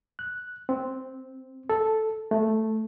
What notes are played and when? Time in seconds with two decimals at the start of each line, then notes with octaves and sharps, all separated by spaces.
0.19 F#6
0.69 C4
1.70 A4
2.31 A3